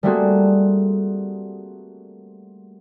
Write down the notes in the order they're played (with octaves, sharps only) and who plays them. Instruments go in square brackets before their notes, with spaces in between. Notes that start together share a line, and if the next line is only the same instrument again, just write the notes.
[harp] G3 A3 A#3 C4 F#4 G#4